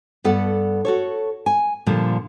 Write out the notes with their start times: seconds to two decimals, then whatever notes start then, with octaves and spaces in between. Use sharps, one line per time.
0.24 G2 B3 A4 D5 F#5
0.85 F#4 A4 C#5
1.46 G#5
1.86 A#2 D3 F3 G3